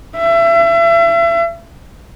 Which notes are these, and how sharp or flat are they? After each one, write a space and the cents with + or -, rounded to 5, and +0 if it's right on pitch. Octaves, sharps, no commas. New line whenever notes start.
E5 +35